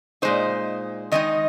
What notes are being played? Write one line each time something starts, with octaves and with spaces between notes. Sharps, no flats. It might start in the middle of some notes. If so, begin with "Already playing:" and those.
A#2 G#3 D#4 C5
D#3 G#3 D#4 D#5